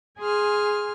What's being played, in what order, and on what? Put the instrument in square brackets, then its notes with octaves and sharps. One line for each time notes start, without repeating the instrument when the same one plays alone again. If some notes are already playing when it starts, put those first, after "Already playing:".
[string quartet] G#4 G#5 C6 F6